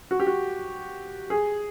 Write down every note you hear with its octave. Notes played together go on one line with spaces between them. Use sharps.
F#4
G4
F#4
G#4